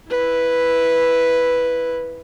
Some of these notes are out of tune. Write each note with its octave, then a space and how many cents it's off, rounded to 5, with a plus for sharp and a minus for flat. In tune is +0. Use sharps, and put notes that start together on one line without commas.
E4 +0 B4 +0